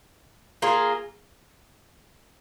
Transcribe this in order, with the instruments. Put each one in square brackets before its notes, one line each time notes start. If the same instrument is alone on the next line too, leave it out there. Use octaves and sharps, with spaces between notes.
[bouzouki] A#3 F4 G#4